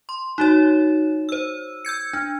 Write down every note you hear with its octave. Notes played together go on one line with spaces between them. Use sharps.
C6
D#4 F#4 C#5
C5 E6
E6 G6 G#6 C#7
D4